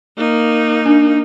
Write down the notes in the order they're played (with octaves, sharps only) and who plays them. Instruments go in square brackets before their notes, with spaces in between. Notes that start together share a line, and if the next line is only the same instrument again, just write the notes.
[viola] A#3 D#4
[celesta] D4